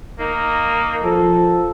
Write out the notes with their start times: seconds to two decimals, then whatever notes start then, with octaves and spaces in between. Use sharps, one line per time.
0.20 A#3 D#4
1.03 F3 A4